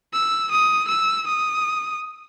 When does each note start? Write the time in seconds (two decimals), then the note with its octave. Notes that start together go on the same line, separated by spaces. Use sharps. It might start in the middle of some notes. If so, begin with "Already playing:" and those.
0.13 E6
0.51 D#6
0.88 E6
1.27 D#6